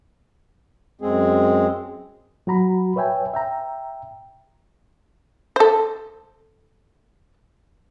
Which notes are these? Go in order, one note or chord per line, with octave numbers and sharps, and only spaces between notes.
F#2 G#3 C4 G#4
F#3 F#4 A#5 B5
B4 C#5 E5 G5 G#5
E5 G5 A#5
A4 C5